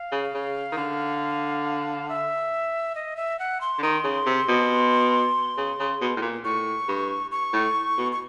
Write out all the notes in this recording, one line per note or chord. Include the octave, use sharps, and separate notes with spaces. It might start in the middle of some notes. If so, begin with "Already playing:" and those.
Already playing: F5
C#3
C#3
D#3
D3
E5
D#5
E5
F#5
C6
D3
D#3 C6
C#3
C3
B2
C#3
C#3
B2
A2
A#2
A2 C#6
G2
C#6
A2
B2
C#6